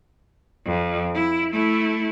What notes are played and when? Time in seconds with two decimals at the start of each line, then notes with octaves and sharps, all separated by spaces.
0.66 F2
1.14 E4
1.52 A3 E4